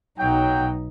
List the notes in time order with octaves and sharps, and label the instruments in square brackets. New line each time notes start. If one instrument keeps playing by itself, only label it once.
[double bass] B1 D#4 [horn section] F#3 G5